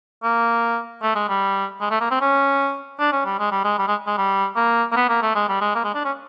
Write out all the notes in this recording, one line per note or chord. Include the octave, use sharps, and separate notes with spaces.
A#3
A3
G#3
G3
G#3
A3
A#3
C4
C#4
D4
C#4
G3
G#3
G3
G#3
G3
G#3
G#3
G3
A#3
A#3
B3
A#3
A3
G#3
G3
G#3
A#3
G#3
D4
C#4